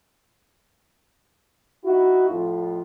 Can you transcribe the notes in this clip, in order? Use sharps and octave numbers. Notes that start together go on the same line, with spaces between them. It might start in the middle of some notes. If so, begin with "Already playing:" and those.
D#4 E4 F#4
F2 A2 F4